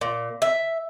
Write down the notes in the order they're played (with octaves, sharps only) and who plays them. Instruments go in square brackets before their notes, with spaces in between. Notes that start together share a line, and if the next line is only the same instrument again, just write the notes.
[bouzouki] A#2
E5